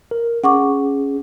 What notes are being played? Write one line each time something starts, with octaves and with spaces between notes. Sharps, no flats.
A#4
C#4 G#4 F#5 C#6 D6